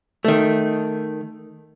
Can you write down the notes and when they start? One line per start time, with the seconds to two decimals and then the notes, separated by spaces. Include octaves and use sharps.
0.25 D#3 A3